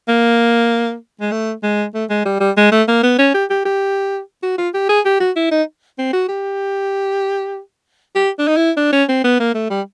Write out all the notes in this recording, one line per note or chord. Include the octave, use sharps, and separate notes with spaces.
A#3
G#3
A3
G#3
A3
G#3
G3
G3
G#3
A3
A#3
B3
C#4
G4
G4
G4
F#4
F4
G4
G#4
G4
F#4
E4
D#4
C4
F#4
G4
G4
D4
D#4
E4
D4
C#4
C4
B3
A#3
A3
G3